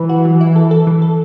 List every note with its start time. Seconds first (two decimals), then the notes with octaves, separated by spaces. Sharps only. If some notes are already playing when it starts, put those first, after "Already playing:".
Already playing: E3 B4
0.09 F#4
0.25 F#3
0.41 E4
0.56 A4
0.71 A4
0.87 E3
1.02 A4